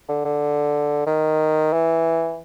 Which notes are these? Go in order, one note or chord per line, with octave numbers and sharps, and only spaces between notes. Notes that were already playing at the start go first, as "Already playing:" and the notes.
D3
D3
D#3
E3